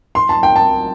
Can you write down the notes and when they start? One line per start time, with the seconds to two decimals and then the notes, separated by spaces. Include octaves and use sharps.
0.15 C6
0.29 A5
0.43 G5
0.56 A5